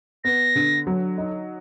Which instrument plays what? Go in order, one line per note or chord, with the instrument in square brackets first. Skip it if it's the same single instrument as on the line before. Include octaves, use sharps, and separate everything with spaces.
[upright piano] B3 [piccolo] A#6
[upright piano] D3
F#3
D#4